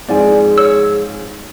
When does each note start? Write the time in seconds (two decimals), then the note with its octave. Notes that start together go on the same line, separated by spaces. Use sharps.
0.08 G#2 F3 C4 G#4 D5 G#5
0.58 C#5 E6